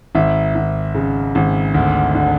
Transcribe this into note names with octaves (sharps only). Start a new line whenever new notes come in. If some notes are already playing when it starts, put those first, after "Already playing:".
G#1 E5
G#1
C#3
G#1
D2
D3